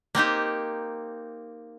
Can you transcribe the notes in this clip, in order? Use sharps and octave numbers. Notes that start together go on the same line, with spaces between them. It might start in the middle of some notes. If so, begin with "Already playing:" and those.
A#3 C4 D#4 G4